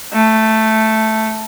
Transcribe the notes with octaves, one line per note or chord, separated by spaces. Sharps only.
A3